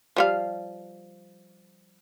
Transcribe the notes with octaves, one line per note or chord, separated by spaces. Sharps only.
F3 G3 F5